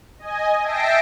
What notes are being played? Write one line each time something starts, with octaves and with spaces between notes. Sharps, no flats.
D#5 G#5
E5 G5 A5 A#6 C7 D7